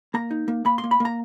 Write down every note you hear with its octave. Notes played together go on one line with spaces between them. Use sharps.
A#3 A#5
D#4
A#3
A#3 B5
C6
A#3
B5
A#3 A#5